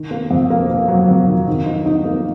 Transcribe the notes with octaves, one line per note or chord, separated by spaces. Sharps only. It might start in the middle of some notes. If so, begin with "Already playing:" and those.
Already playing: D#3
A#3
F2
A#3
A#3
F#3
F2
D#3
D#3
D#4
D#4
A#3